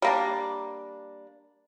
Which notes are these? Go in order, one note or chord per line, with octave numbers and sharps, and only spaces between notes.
G3 A#3 D4